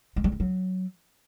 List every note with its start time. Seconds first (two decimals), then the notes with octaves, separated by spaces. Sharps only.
0.16 G#3
0.24 G3
0.32 A3
0.40 F#3